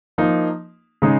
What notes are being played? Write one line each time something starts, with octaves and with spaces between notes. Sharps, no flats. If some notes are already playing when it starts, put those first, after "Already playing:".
F3 A#3 D#4
C#3 G#3 D#4